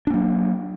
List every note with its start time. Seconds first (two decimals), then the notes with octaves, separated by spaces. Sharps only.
0.07 D4
0.10 A#3
0.14 F#3